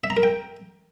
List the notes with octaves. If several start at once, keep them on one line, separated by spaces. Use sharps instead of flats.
E5
A#5
A#4
G5